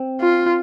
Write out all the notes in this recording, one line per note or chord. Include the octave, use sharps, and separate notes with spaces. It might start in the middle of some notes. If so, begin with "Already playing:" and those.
Already playing: C4
F4